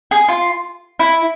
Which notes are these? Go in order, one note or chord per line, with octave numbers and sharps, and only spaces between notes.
G#4
F4
E4